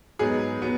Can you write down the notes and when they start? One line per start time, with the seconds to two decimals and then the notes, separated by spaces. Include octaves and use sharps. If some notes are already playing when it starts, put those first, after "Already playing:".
0.19 G#2 F#3 B3 G#4
0.62 F#3 B3